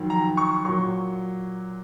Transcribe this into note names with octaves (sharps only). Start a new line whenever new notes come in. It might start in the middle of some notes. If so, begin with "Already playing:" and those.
Already playing: F2 D#3 F#3
A#5
C#6
A#2 F#3 C#6